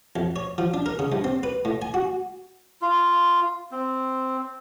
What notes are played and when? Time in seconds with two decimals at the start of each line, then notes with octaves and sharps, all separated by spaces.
0.16 F2
0.36 C#5
0.58 F3
0.74 D4
0.86 A#4
0.99 C#3
1.12 G2
1.24 C4
1.43 B4
1.65 A2
1.82 G#5
1.94 F#4
2.82 F4
3.72 C4